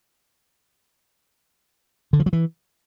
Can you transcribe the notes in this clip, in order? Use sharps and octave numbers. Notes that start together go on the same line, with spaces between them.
D3
F3
F#3
E3